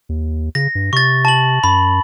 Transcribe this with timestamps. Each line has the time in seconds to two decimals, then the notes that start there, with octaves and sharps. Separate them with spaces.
0.09 D#2
0.55 C#3 A#6
0.75 G2
0.93 C3 C#6 A6
1.25 A5 F#7
1.64 F#2 B5